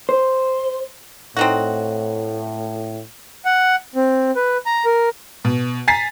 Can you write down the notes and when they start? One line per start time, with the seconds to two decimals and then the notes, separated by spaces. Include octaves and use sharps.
0.09 C5
1.37 A2 C4 D#4 F#4
3.45 F#5
3.95 C4
4.36 B4
4.66 A#5
4.85 A#4
5.45 B2
5.88 G#5 A#5 A6 B6 C7